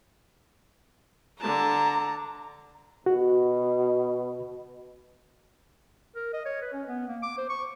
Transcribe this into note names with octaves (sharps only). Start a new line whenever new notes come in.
D3 A5 A#5
B2 F#4
A#4
D#5
C#5
B4
C#4
B3
A#3
D6
C5
C#6